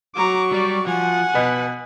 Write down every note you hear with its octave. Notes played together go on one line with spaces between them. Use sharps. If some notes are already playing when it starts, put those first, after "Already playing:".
F#3 A#5 C#6 D6
G3 D5
F3 F#5 G#5
B2 B4